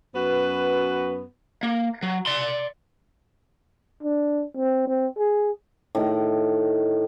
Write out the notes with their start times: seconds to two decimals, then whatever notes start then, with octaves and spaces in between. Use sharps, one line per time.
0.14 F#2 B3 F#4 B4
1.63 A#3
2.03 F#3
2.26 D5 C6
4.03 D4
4.57 C4
4.88 C4
5.17 G#4
5.95 A2 D#3